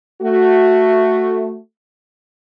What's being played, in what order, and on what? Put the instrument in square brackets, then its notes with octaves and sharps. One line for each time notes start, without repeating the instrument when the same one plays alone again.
[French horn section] A3 F#4